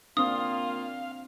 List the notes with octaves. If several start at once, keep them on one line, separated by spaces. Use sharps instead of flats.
A#3 C4 D4 F4 F5 D#6